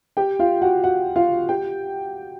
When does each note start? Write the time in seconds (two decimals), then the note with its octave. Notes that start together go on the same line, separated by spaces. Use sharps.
0.17 G4 G5
0.39 F4 F5
0.62 F#4 F#5
0.84 F#4 F#5
1.16 F4 F5
1.49 G4 G5